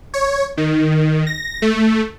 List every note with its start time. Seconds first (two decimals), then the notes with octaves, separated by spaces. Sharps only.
0.14 C#5
0.57 D#3
1.26 A#6
1.62 A3